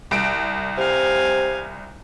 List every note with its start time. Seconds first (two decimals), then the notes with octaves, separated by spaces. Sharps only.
0.11 C2 D7
0.78 C3 F5 G#5